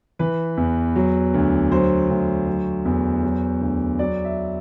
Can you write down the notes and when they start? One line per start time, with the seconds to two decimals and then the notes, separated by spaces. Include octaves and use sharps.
0.19 E3 B4
0.57 E2
0.96 F#3
1.34 D2
1.71 F#3 C5
2.10 D2
2.47 F#3
2.85 E2
3.23 F#3
3.61 D2
3.99 F#3 D5
4.25 E5